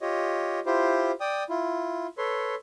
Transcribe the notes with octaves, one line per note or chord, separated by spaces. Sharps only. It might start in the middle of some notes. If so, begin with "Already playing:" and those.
F4 G4 C#5 D#5
E4 F4 G4 C5
D5 G5 D#6
E4 F4
A4 B4 C#5 C6